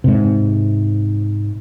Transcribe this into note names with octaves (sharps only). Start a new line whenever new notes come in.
G#2 C3